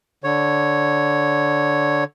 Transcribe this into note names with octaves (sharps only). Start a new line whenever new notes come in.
D3 C#5